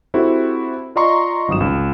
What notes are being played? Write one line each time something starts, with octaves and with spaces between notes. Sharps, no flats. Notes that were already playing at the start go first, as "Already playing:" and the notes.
C4 E4 F#4 G4 A4 C5
F4 D5 D#5 A#5 C6 C#6
G#1 G2 F#3 D#6 E7
C#2